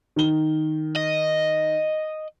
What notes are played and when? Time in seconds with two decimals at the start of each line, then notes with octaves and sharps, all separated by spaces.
0.16 D#3 G7
0.96 D#5